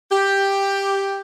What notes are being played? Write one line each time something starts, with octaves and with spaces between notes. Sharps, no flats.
G4